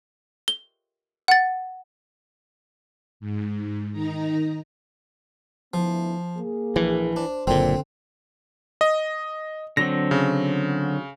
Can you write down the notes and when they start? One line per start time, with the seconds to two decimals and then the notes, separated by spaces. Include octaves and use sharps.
0.48 G7
1.28 F#5 A6
3.20 G#2
3.92 D#3 D#4 A#5
5.74 D2 F3 B3 E4
6.36 A#3 G#4
6.76 A#1 E3
7.16 D4 C5
7.47 F#1 A#2 D3 C4
8.81 D#5
9.77 D3 F#3 C4 A#6
10.11 C#3